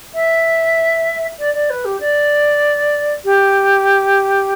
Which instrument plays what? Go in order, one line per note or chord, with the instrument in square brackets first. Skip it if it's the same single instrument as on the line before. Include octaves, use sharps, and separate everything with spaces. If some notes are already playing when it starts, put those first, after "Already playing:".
[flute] E5
D5
D5
B4
G4
D5
G4